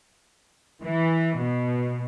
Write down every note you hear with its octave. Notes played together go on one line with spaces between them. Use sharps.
E3
B2